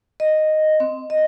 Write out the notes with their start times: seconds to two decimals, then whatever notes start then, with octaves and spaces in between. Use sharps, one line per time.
0.20 D#5
0.80 C4
1.10 D#5